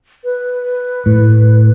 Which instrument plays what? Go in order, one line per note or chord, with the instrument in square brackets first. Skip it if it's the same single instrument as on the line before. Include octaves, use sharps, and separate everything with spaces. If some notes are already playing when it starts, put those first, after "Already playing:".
[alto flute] B4
[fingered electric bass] A2